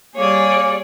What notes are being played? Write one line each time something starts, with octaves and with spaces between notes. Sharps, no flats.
G3 A#3 G#4 C#5 D5